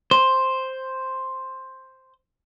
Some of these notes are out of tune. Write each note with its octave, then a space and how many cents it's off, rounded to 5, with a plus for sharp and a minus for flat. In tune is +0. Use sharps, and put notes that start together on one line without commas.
C5 +5